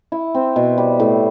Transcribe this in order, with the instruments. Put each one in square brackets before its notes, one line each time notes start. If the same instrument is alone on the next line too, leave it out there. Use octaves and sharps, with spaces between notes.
[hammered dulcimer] E4
C4
B2
G3
A2